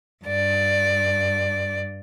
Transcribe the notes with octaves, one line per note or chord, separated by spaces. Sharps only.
G2 D5